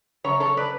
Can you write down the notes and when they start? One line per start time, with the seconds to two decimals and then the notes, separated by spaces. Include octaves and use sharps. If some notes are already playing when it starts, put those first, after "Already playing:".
0.24 F#2 C#3 C#5
0.40 A4 C#5
0.57 B4 D5